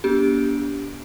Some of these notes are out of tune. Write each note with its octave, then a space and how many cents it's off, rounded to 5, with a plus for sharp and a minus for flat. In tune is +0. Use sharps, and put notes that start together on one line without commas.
B3 -45 D4 -35 G4 +0